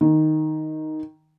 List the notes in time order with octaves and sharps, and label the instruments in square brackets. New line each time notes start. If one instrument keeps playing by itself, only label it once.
[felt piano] D#3